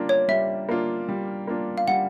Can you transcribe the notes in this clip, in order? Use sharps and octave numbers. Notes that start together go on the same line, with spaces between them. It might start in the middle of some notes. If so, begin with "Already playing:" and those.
Already playing: G3 A#3 D4 F4
C#5
G3 E5
A#3 D4 F4
G3
A#3 D4 F4
F5
G3 F#5